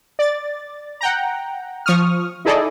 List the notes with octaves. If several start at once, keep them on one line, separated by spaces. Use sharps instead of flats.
D5 A6
F#5 G5 A#5
F3 C#6 D#6 F6
D#4 E4 G#4 A4 D5 D#5